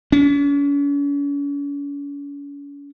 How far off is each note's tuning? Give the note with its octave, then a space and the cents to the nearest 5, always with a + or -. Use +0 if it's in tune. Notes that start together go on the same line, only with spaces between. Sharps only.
C#4 +45